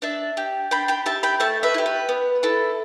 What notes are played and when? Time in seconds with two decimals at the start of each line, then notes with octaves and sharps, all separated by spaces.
0.02 D4 E5 A5
0.37 G4
0.71 D4 G5 B5
0.88 G5 B5
1.06 G4 E5 A5
1.23 G5 B5
1.40 A3 E5 A5
1.63 B4 E5
1.74 E4
1.78 G4
1.86 B4
2.09 B3
2.43 E4 A4